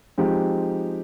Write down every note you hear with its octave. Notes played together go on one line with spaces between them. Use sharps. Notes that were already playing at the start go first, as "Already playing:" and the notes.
F3 G#3 C4 D#4 G4